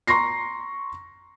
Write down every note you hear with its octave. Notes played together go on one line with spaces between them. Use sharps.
A#5 C6 C#6 A#6 C7